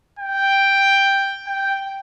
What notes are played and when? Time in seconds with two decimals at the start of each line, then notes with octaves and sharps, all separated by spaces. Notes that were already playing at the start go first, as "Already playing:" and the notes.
0.19 G5
1.47 G5